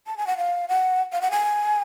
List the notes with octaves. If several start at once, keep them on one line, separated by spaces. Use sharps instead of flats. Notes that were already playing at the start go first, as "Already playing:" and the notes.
A5
G#5
F#5
F5
F#5
F5
F#5
G#5